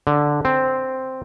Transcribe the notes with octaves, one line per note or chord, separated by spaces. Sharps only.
D3
C4